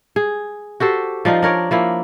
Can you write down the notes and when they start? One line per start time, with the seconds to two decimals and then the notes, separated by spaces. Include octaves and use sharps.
0.16 G#4
0.80 F#4 G4 A4 C5
1.25 F3 D4 D#4 F4
1.42 D4 A#4 C#5 D5
1.71 F3 A#3 E4